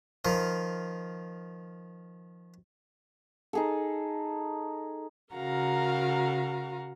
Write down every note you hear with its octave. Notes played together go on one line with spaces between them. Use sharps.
D#3 F3
D#4 G#4 A4
C#3 F#4 A#4 F5 A#5